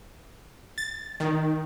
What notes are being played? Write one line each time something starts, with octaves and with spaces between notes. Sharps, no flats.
A6
D#3